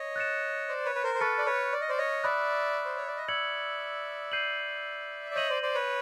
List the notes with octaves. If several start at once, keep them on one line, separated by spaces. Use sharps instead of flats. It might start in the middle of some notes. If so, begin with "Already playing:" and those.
Already playing: C#5 D#5
F#6 A6 C#7 E7
C5 D5
B4 C#5
B4
A#4 C5
C5
A4 B4 C#6 F6 A6 C#7
D5
B4 C#5
D5
D#5
C5 D5
C#5 D#5
D5 E5 B5 D#6 F#6
C5
C#5
D5
D#5
D5 E5 E6 G#6 C#7 F#7
G6 C7 D#7 F#7
D5
C#5 D#5 G6 A#6 D#7 F#7
C5 D5
C5 D5
B4 C#5